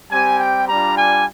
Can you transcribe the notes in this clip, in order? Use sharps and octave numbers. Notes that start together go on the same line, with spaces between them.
G3 C4 G4 G#5
G5
G3 D4 F4 A#5
G#5